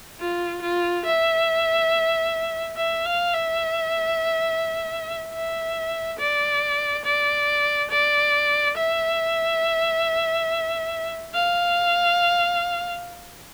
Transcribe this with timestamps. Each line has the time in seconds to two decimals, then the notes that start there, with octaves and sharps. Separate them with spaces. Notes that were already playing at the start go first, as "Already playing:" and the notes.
0.20 F4
0.62 F4
1.05 E5
2.76 E5
3.05 F5
3.34 E5
5.33 E5
6.19 D5
7.05 D5
7.91 D5
8.76 E5
11.34 F5